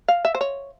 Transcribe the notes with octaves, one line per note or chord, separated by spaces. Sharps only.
F5
E5
C5
C#5